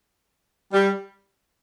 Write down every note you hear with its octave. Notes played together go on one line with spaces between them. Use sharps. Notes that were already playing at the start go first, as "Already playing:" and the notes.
G3